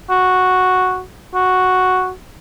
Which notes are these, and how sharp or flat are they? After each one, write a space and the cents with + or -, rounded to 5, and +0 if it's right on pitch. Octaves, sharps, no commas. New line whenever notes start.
F#4 -5
F#4 +0